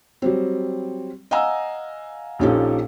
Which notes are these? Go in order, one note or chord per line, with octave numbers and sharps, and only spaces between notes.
F#3 G3 C4
D#5 F5 F#5 G#5 A#5 E6
A#1 A#2 C#4 D#4 G4 A4